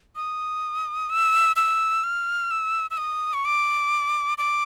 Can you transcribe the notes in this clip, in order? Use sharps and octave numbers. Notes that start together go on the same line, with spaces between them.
D#6
E6
E6
F6
E6
E6
D#6
C#6
D6
D6